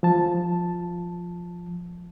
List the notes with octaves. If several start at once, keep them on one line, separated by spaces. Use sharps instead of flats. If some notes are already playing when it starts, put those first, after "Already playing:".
F3 A5